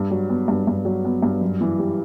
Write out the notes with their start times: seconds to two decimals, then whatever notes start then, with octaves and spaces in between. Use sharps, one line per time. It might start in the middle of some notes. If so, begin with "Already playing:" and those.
Already playing: G2
0.11 F#3
0.29 B3
0.48 G2
0.67 G2
0.85 F#3
1.05 B3
1.22 G2
1.41 F#2
1.61 E3
1.79 G3